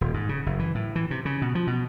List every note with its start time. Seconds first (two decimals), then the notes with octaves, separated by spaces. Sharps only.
0.01 D#1
0.14 G#2
0.29 C#3
0.46 F#1
0.59 E3
0.75 A2
0.95 E3
1.11 C3
1.25 C#3
1.42 B2
1.55 F3
1.67 B2